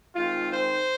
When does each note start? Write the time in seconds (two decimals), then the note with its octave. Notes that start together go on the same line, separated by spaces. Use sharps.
0.15 D#3 G#3 C4 F4
0.53 C5